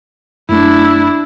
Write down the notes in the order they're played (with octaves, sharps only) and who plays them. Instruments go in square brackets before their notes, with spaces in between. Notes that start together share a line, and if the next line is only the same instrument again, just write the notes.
[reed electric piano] F#2 A3 [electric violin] D4 E4